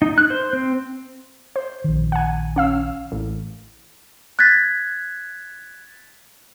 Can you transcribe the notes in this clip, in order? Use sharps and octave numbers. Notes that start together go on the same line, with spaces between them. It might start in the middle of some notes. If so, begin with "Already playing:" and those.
D#4
F#6
C5
C4
C5
A#1 D#3
F#5 G#5
C#4 F5 E6
A1
F#6 G#6 A6 B6